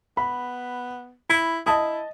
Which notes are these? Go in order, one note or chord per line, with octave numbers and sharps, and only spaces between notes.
B3 B5
E4 B5
E4 D#5 A5 D#6